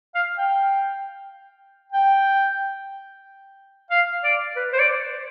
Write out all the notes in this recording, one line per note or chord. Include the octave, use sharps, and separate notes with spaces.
F5
G5
G5
F5
D5
B4
C5
D5